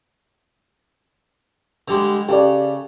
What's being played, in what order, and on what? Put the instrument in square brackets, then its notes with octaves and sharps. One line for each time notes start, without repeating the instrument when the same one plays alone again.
[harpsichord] D3 G3 G#3
[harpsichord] C#3 [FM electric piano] G4 A4 D5